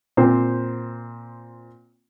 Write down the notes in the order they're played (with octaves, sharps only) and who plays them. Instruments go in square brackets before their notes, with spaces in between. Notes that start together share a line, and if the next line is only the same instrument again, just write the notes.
[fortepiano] A#2 C4 C5